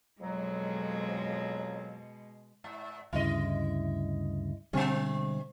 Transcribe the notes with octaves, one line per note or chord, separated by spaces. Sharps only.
F2 B2 F#3 G#3
G#2
D2 G2 C#3 E4 D#5
B2 D3 G3 G#3 C4